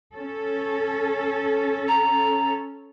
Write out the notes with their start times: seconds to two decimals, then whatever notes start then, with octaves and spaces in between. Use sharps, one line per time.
0.17 C#4 A4
1.88 A#5